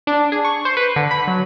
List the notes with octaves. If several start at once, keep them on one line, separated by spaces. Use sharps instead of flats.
D4
G#4
C#6
C5
B4
D3
B5
F#3